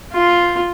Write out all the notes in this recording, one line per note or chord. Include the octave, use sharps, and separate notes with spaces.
F4